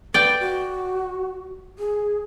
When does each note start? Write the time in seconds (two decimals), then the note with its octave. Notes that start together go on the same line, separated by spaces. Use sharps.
0.14 B4 D5 G5
0.40 F#4
1.78 G#4